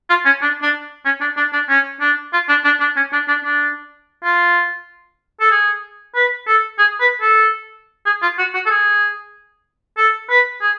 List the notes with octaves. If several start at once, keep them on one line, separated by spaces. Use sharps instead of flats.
F4
C#4
D4
D4
C#4
D4
D4
D4
C#4
D4
F4
D4
D4
D4
C#4
D4
D4
D4
F4
A4
G#4
B4
A4
G#4
B4
A4
G#4
F4
F#4
F#4
A4
G#4
A4
B4
G#4